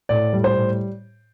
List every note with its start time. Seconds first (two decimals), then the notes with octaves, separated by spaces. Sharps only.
0.09 A2 D5
0.33 G3
0.44 C5
0.55 A2